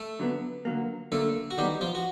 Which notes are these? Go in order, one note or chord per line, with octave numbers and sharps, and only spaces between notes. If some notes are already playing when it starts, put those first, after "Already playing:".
Already playing: A3 A4
D3 F#3 B3
D3 F#3 A#3
D3 F#3 A3 A#3 A4
F#4
D#3 F#3 G3 B3 D#4 G4
F3 F4
F#4